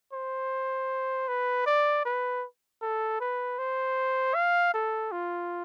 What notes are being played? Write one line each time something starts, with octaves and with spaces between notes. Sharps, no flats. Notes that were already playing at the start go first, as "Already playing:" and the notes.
C5
B4
D5
B4
A4
B4
C5
F5
A4
F4